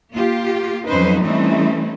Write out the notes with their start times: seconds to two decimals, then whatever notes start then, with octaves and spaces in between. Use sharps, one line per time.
0.13 A#3 F4 G4
0.87 F2 F#3 C#4 D#4 B4 C5
1.23 E3 G3 A3 C4 C#4 D#4